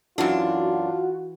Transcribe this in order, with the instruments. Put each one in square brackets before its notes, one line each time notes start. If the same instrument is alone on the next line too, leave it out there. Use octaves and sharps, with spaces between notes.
[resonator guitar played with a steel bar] F#2 D4 [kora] E3 [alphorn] F4 [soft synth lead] F#4